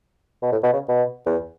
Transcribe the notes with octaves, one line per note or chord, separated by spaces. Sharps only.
B2
A2
B2
C#3
B2
E2